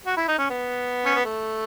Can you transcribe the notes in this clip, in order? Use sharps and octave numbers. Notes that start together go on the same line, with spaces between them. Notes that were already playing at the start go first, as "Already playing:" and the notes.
F#4
E4
D#4
C#4
B3
C#4
B3
A3